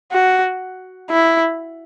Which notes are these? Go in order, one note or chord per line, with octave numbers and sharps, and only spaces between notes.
F#4
E4